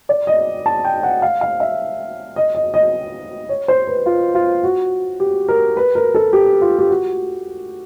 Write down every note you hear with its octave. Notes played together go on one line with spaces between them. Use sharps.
D5
D#5
A5
G5
F#5
F5
F5
E5
D#5
D#5
D#5
C#5
C5
B4
F4
F4
F#4
G4
A#4
B4
A#4
A4
G4
F4
G4
F#4